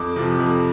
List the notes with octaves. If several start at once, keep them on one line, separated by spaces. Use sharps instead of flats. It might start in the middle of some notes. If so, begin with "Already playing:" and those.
Already playing: F2 D6
C3 F3
F2